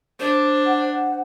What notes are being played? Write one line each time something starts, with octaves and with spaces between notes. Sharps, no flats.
D4 C5
F#5